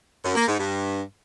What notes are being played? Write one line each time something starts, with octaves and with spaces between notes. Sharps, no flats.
F#2
A#3
G#2
G2